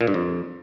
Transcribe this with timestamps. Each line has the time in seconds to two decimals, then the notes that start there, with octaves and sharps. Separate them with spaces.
0.01 A#2
0.07 G2
0.14 F2